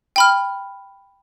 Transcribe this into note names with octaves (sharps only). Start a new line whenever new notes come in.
G5 B5 F6